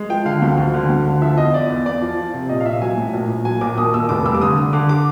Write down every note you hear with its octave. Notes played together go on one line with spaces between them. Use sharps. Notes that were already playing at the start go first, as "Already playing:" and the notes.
Already playing: G#3
F3 G5
D3 F5
D2
D2
D3
D2
D3
F3 E5
E2 D#5
E2 D5
E2
E2 D5
F3
F3
C3
A#1 D#5
F5
A#1 E5
F#3 G#5
A2
A#1
A#1
F#3 G#5
A#1 D6
D#2 D#6
D#2 E6
F1 D6
G3 E6
D6
D3 D#6
D3
D3 D6
D6